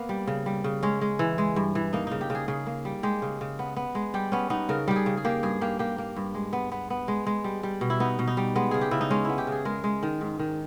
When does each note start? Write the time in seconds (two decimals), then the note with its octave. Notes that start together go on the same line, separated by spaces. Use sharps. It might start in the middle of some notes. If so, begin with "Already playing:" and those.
Already playing: A#3 B3
0.09 G3
0.27 C#3
0.46 G3
0.64 C#3
0.83 G#3 C#4
1.01 G#3
1.19 E3
1.38 G#3
1.56 G2
1.75 E3
1.93 A#3 D#4
2.07 C#3 D#4
2.21 G4
2.30 C#3 G#4
2.48 C#3 G#4
2.66 A#3
2.85 G3
3.03 G#3 G4
3.22 C#3
3.41 C#3
3.59 B3
3.76 B3
3.95 G#3
4.14 G3 G4
4.32 B3 C#4
4.50 B3 D#4
4.69 C#3 A#4
4.88 G3 G4
4.96 G#4
5.06 C#3
5.17 G#4
5.25 A#3 G4
5.43 G2 G#4
5.61 A#3 G4
5.79 A#3 G4
5.98 A#3
6.16 G2
6.35 G#3
6.53 B3
6.72 B3
6.90 B3
7.08 G#3
7.27 G#3
7.44 G3
7.63 G3
7.81 B2
7.90 E4
8.00 B3 D#4
8.19 B2
8.28 D#4
8.37 G3
8.56 G#3 B3
8.71 C#3 G#4
8.81 G4
8.91 C#3 E4
9.01 D#4
9.10 G#3 C#4
9.25 B3 E4
9.38 G4
9.47 C#3
9.52 G#4
9.65 G#3 A#4
9.84 G#3
10.03 D#3
10.21 G#2
10.39 D#3